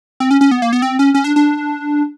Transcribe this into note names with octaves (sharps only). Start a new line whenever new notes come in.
C4
C#4
C#4
B3
A#3
B3
C4
C#4
C#4
D4
D4